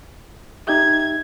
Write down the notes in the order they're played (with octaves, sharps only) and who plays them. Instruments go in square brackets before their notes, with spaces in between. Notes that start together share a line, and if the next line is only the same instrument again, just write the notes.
[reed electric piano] D#4 G4 E5 [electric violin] G#6